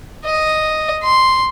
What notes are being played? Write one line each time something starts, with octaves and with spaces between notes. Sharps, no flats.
D#5
C6